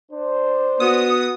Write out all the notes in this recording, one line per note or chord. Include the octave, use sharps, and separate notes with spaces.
D4 C5
B3 F#4 D#6